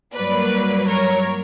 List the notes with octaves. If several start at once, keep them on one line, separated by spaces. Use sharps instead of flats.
G2 F#3 A#3 B4 D5
A#4 C#5